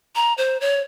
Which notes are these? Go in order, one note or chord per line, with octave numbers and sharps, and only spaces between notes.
A#5
C5
C#5